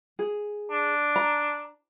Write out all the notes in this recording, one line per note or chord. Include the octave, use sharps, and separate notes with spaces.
G#4
D4
A#5